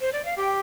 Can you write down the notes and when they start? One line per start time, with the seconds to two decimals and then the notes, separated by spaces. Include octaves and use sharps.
0.01 C5
0.13 D5
0.25 F5
0.37 G4 G5